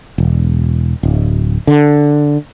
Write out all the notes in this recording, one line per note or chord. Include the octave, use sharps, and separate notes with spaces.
E1
D1
D3